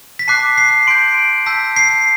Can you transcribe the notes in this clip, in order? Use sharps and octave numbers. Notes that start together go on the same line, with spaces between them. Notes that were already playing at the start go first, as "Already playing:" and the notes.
B6
A5 D6 F#6 C7
C7
C6 G6 D7
A5 E6 G6 B6
C7